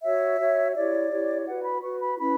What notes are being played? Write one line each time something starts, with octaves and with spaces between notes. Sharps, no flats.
F#4 C#5 E5
F#4 C#5
E4 G4 C#5 D5
E4 G4 C#5
F#4 B4 F#5
B5
F#4 B4 C#6
B5
C#4 E4 B4 B5